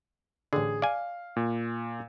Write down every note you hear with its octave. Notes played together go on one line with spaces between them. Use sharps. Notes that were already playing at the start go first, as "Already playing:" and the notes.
A1 D3 G#4
D5 F5 G#5
A#2